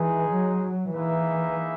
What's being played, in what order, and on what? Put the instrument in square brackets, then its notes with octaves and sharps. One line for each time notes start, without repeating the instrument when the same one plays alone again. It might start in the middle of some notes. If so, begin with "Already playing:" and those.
Already playing: [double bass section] E3 [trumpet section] G#3 D#4 G#4
[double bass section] F#3
[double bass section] E3 [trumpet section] A#3 D#4 G#4 B4 E5